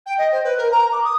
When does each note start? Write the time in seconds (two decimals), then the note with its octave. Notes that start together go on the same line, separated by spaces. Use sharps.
0.06 G5
0.18 D#5
0.32 C5
0.44 B4
0.58 A#4
0.71 A#5
0.92 D6
1.04 D#6